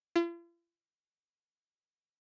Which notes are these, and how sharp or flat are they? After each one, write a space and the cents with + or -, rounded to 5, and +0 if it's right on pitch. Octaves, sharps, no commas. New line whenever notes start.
F4 -45